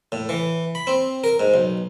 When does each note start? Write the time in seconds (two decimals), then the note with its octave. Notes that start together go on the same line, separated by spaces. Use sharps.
0.12 A2
0.29 E3
0.75 B5
0.87 C4
1.24 A#4
1.40 G#2
1.54 B1